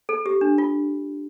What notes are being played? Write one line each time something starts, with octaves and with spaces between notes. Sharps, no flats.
A4
G4
D4
F4